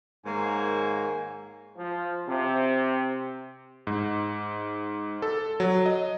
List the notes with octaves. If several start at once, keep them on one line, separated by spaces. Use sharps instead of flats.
G#2 D#3 A#3 C#5 G#5
F3
C3
G#2
A4
F#3
D#5